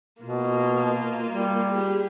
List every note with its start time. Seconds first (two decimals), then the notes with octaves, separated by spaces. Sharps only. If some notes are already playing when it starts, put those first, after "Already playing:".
0.22 B2 A#3 F4
1.28 G3
1.72 G4 G#4